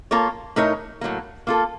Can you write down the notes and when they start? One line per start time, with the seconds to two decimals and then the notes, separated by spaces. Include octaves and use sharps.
0.11 A#3 F4 A4 C#5
0.56 A2 A3 D#4 A#4 C#5
1.01 A2 F#3 A#3
1.47 A#3 F4 A4